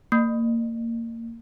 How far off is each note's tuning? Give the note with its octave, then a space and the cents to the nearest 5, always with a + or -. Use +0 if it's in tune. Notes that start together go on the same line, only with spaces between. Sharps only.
A#3 -20